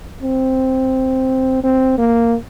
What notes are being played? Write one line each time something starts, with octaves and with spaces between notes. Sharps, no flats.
C4
C4
A#3